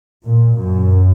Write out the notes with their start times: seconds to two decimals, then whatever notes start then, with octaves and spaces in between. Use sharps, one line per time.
0.24 A#2
0.57 F#2